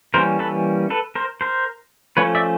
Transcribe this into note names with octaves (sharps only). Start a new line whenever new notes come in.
E3 G3 A#3 C#4 A#4 C5
A4 B4
A4 B4
A#4 C5
A#4 C5
F3 A3 C#4 B4 C#5
D5 E5